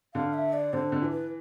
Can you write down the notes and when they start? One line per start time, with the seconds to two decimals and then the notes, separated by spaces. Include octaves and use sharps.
0.14 D3 F5
0.34 E5
0.53 D5
0.73 D3 C5
0.92 D3
1.02 E3
1.11 B4